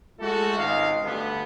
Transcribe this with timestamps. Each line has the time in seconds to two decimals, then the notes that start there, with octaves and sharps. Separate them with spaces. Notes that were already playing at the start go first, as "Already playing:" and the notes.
0.20 G#3 A3 F4 F#4 A4
0.57 G#1 C#2 D#5 F5
1.04 D2 G2 D3 B3